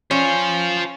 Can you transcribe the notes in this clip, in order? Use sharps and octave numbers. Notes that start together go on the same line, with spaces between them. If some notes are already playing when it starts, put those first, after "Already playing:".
C#4 F4 C5